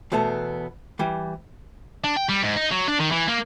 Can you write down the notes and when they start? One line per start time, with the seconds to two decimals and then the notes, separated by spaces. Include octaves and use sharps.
0.12 E2 B2 A3 B3 A5
0.99 E3 G3
2.04 D4
2.16 G5
2.29 G3
2.43 G#2
2.56 D#4
2.71 F#3
2.88 D4
3.00 D#3
3.12 E3
3.29 A#3